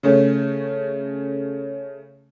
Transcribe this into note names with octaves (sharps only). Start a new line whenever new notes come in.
C#3 A3 C#4